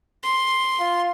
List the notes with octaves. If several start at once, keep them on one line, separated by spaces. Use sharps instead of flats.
C6
F4